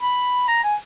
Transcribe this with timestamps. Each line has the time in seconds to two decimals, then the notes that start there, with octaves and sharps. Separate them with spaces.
0.01 B5
0.48 A#5
0.64 G#5